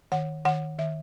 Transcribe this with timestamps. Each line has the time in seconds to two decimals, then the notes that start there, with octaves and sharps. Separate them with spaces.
0.12 D#3 F#5
0.45 D#3 F#5
0.78 D#3 E5